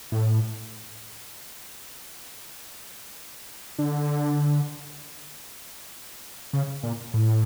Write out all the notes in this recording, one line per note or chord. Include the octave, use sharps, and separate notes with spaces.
A2
D3
C#3
A#2
A2